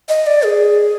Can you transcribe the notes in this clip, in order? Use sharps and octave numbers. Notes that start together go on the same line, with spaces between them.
D#5
D5
G#4